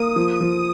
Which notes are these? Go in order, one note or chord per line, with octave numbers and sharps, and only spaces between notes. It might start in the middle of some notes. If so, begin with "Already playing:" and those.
Already playing: A#3 D#6
F3
F3